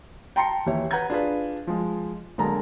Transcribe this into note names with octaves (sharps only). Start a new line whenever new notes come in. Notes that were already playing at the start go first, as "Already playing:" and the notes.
G5 A5 A#5 C6 C7 C#7
D#2 E3 G4 C#5 E5
B4 F#5 A#5 G6 G#6
D4 F4 G#4 B4
F3 G#3
B1 D3 G#3 A#3 A5 A#5